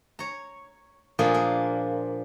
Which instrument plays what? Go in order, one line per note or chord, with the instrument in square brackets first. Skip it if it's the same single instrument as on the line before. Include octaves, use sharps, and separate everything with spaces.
[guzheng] C#5 A#5
A#2 F3 A#3 D4 G#4
A#3